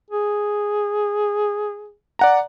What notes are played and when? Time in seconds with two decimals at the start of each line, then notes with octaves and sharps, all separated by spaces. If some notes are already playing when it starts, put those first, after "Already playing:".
0.10 G#4
2.19 D5 F#5 A#5